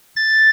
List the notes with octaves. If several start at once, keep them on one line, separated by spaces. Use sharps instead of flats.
A6